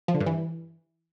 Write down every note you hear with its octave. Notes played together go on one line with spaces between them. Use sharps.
F3
D3
G2
E3